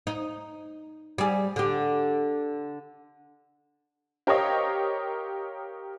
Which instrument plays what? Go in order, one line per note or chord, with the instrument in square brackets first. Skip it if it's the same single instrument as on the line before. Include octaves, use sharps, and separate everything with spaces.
[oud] D#4
G3 G#4
D3 G4
[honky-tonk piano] G4 A#4 C5 C#5 D#5 F5